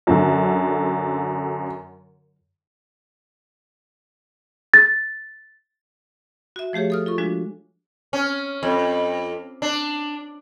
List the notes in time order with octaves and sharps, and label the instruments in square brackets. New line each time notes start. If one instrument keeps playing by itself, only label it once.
[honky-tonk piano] F#2 D3
[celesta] A6
[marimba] F#4 E5
F3 A3 G4 G#4 C#5
A4 D#6 F6
F4 A4 C#6
F3 G#3 D4 F#4
[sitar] C#4
F2
D4